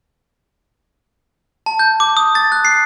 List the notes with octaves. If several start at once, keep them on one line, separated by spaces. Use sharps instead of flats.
A5
G6
D6
D#6
A6
F#6
C7